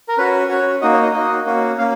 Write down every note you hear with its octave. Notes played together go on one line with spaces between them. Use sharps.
A#4
C#4 F#4 B4
C#4 F#4 C#5
A#3 D#4 F#4 D#5
C#5
D#5
A#3 D#4 F#4 D#5
A#3 C#4 F#4
A#3 C#4 F5